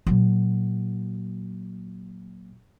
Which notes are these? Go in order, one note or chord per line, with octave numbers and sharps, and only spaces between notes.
A#2 F#3